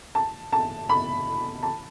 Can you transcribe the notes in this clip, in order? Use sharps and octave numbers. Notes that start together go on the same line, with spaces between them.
A5
A5
B5
A5